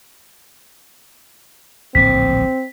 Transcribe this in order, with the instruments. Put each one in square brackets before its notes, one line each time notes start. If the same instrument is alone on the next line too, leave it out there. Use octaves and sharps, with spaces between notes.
[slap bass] D1 A#1 A2 [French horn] C4 [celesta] B6